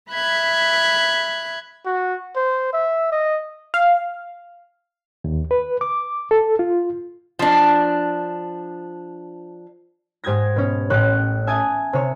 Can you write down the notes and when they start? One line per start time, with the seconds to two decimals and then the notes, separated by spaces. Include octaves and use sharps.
0.10 E5 B5 F#6 G#6
1.86 F#4
2.36 C5
2.73 E5
3.12 D#5
3.74 F5
5.24 D#2
5.51 B4
5.81 D6
6.31 A4
6.59 F4
7.39 F3 D4
10.24 G#2 G4 D#6 G#6 A#6
10.56 B2 C#4
10.90 A1 A2 G5 C#6 F#6
11.47 E5 G#5 A5 D#6 G#6 D#7
11.93 C3 C#5